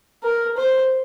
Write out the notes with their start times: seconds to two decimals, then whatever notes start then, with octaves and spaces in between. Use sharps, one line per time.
0.23 A#4
0.57 C5